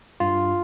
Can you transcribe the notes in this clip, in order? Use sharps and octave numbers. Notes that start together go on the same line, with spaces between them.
G2 F4